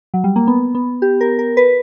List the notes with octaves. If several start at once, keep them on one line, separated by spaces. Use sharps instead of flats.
F#3
G3
A#3
B3
B3
G4
A#4
A#4
B4